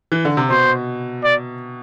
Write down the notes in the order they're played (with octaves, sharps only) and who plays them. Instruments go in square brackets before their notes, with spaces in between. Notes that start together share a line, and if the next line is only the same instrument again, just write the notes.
[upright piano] E3
D3
C3
[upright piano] B2 [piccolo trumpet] C5
[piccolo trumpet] D5